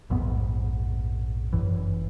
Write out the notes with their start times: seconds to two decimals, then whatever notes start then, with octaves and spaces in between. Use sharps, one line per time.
0.10 A#1 F2 G#2 B3
1.53 G1 F#2 E3